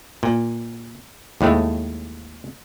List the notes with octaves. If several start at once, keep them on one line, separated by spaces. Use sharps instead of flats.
A#2
D#2 A2 G#3 A3